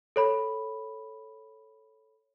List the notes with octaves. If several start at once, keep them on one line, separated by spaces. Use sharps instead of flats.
A4 C#5 B5